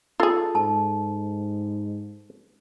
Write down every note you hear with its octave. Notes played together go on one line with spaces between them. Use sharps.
F4 G#4 A4
G#2 A5